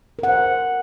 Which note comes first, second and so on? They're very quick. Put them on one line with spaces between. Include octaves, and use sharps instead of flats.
A#4 F#5 C5